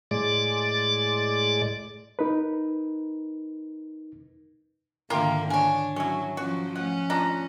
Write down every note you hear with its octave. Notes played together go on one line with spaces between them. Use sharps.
A2 G#3 D5 D6 A6
D#4 A#4 B4
G#2 D3 D#3 A#3 F4 G4 A#4 E5
D4 C#5 G#5
F#3 C#4 E4
F3 F#3 C#4 F#4
F3 A3 C#4 F#5
D4 F4 A#5 C6